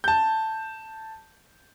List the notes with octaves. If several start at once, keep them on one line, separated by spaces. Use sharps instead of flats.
A5 G6